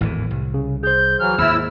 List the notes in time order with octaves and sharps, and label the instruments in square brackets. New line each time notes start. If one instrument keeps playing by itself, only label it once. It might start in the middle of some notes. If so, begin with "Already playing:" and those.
[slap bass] G#1 E2 E3 [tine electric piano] A2
[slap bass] C2
[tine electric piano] C#3
[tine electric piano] G#4 C5 [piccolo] G6
[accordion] E3 F#3 [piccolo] F6
[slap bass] D#2 G#2 [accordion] E4 E6